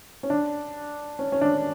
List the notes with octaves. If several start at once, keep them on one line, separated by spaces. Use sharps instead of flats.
C#4
D4
C#4
C#4
D4